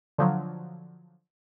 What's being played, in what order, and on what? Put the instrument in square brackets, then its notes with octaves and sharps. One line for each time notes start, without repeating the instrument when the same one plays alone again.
[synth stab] D3 F3 F#3